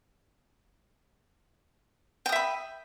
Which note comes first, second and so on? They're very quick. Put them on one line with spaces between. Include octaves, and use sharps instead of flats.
G5 D#6 E5 B5